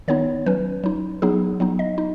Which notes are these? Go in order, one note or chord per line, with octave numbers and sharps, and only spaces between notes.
D#3 B3 D#4 C#5
F#3 C#4 B4
F#3 D#4
F#3 B3 D#4 G#4
F#3 B3 D#4
D#5
D#4